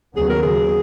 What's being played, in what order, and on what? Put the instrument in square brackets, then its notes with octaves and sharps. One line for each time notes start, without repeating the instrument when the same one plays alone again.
[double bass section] D#2 C#3 F#3 B3 [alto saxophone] G#4
[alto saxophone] A#4
G#4